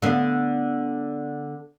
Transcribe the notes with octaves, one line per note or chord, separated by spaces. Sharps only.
D3 B3